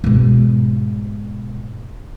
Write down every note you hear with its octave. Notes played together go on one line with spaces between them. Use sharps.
G#2 B2